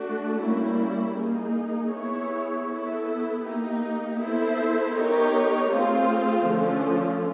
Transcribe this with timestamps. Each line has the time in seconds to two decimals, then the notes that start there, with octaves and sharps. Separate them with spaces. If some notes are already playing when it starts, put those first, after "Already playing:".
Already playing: A3 D4 F#4
0.40 G3 A#3 C#4 E4
1.16 A#3 D#4 G#4
1.92 B3 E4 G#4 C#5
2.68 B3 E4 A4
3.44 A#3 D#4 G4
4.19 B3 E4 A4 C5
4.95 B3 D#4 G4 A#4 C#5
5.71 A3 C4 F4 G#4 C5
6.47 D3 F3 A3 C#4 F4